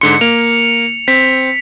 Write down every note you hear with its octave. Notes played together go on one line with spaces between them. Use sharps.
G#2 D3 C6 C#7
A#3 F7
C4 B6